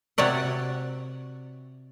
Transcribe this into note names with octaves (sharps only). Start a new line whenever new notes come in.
C3 F#4 C#5 D5 F#5